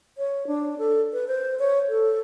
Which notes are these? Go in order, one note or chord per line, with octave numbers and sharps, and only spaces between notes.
C#5
D4
A4
B4
C5
C#5
A4